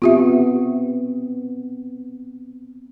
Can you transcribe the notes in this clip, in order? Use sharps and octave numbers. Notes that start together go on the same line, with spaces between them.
B3 C4 F4 G4 E5